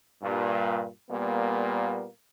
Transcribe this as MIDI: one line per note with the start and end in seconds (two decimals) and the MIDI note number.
0.22 0.86 43
0.22 0.86 46
1.09 2.07 46
1.09 2.07 55
1.09 2.07 58
1.09 2.07 59